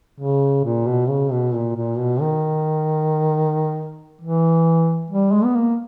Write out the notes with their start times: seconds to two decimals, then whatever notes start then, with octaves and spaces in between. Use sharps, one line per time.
0.20 C#3
0.65 A#2
0.87 B2
1.09 C#3
1.31 B2
1.54 A#2
1.76 A#2
1.98 B2
2.21 D#3
4.21 E3
5.10 G3
5.32 G#3
5.44 B3
5.55 A#3